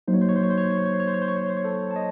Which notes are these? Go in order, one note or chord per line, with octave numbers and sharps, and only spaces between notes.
F#3 A#3 D#4 C5
C#5
C5
C#5
C5
C#5
C5
C#5
C5
C#5
C5
C#5
C5
C#5
C5
C#5
C5
C#5
C5
C#5
C5
C#5
A4 C5
A5
D#5